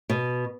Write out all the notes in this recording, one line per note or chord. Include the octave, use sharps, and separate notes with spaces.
B2